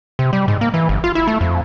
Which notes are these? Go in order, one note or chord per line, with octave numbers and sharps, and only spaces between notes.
C3
G3
G#2
A#3
E3
G1
F4
E4
A3
F2